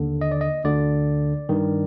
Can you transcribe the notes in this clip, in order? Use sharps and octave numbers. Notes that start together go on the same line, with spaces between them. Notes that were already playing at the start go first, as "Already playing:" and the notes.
Already playing: D#2 D3
D#5
D5
D#5
D2 D3 D5
G2 D#3